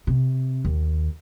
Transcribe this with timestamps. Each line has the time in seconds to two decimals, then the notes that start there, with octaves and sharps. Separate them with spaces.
0.07 C3
0.65 D#2